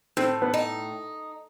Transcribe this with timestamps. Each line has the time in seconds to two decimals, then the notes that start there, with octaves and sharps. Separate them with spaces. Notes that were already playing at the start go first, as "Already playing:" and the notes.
0.17 A2 C4
0.42 B3
0.54 D#4